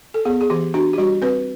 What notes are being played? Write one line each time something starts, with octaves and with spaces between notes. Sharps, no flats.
A4
B3 G#4
G#4
E3 G4
D4 F#4
G4
G3 F#4
C4 B4